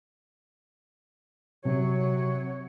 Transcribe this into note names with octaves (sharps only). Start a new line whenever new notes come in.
C3 F#3 C#5